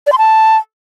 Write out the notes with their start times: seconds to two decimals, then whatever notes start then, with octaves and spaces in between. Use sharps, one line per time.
0.07 D5
0.12 C6
0.18 A5